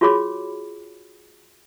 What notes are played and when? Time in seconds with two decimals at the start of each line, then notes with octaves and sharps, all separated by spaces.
0.01 F4 F#4 G#4 C#5 B5 D6